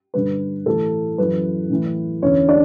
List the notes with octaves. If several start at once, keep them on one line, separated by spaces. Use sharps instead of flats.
G2 D3 B4
A2 E3 A4
F#2 E3 B4
A2 E3
E2 D3 C#4 C#5
D4 D5